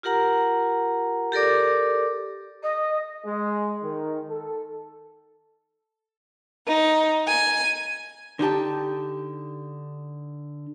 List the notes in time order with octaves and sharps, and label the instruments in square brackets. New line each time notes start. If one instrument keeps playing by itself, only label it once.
[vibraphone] F4 G4 A#4 F#5 A#5
G4 A4 A#4 D5 D6
[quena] D#5
[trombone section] G#3
D#3
A4
[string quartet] D#4
G#5
[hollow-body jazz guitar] D3 D#4 G4 A5